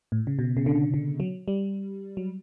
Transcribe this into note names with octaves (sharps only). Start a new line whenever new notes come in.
A2
C#3
B2
C#3
D3
D3
F#3
G3
F#3